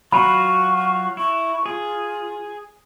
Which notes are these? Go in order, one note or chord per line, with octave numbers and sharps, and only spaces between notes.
F#3 F4 F#4 B5 C#6
E4 C#6
F4 G#4